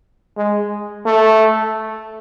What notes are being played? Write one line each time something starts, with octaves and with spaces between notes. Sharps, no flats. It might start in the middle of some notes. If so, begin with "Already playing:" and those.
G#3
A3